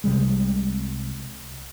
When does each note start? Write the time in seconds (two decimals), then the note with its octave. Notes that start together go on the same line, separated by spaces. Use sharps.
0.04 C2 C3 G3 G#3